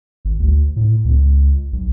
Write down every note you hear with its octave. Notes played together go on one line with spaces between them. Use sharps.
G#1
D2
A2
C#2
B1